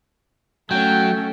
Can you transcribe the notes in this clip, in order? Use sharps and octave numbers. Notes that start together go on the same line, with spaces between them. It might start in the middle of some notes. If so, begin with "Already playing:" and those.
F#3 A3 C#4 G5